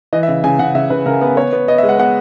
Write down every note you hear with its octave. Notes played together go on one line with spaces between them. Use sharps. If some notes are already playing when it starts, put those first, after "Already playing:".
E3 D#5
E5
C#3
C#3 G#5
C#3 F#5
C#3 E5
C#3 B4
C#3 A#4
B3
B3 C#5
B3
B3 D#5
E5
G#3
F#5
B3 F#5